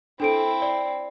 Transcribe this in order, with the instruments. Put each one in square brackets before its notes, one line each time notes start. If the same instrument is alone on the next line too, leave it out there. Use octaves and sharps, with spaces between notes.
[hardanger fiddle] C4 E4 [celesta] D4 A4 D7
[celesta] D5